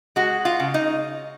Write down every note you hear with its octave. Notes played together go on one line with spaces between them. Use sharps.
G#3 F#4
F4
C#3
D#4